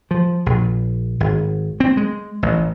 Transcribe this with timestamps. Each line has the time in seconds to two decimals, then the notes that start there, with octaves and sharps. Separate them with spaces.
0.11 F3
0.46 A#1
1.20 G#1
1.80 C4
1.97 G#3
2.43 A1